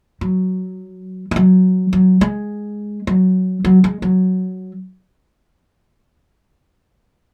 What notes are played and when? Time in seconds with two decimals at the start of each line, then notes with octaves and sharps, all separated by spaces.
0.21 F#3
1.31 G#3
1.36 F#3
1.93 F#3
2.21 G#3
3.07 F#3
3.65 F#3
3.84 G#3
4.02 F#3